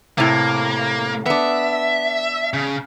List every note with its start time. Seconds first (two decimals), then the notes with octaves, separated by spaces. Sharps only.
0.18 A2 C3 A#3
1.26 B3 D4 E5
2.54 C#3